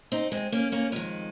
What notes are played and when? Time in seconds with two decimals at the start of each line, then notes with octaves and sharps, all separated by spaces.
0.12 C4 D#4
0.32 G#3 C4
0.52 A#3 C#4
0.72 A#3 C#4
0.92 F2 D#3 G#3